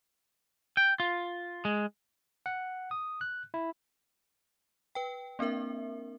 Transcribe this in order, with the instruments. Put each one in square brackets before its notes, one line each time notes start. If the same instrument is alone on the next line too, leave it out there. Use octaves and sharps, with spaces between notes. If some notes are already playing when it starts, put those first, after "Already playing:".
[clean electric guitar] G5
F4
G#3
[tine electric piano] F#5
D#6
F#6
E4
[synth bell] B4 G5
A#3 C4 D4 A#4 E5